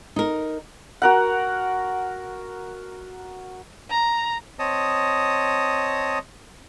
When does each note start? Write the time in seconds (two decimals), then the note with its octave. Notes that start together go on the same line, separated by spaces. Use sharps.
0.16 D#4 A#4
1.02 F#4 A#4 F#5
3.90 A#5
4.59 C4 C#5 D#5 A5 D#6